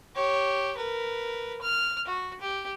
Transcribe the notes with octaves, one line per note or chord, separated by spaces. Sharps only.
G4 C#5
A#4 B4
F6
F#4
G4